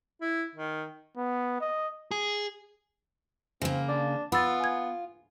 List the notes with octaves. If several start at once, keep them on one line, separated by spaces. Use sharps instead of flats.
E4
D#3
B3
D#5
G#4
C#3 A#3 C4
D4
B3 F4 B5 E6 A6
G#5 G#6